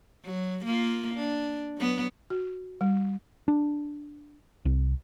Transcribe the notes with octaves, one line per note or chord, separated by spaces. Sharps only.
F#3
A#3 F4
D4
F#3 B3
F#4
G3
D4
C2